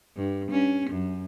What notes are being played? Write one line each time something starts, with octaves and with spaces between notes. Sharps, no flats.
G2
C#4
F#2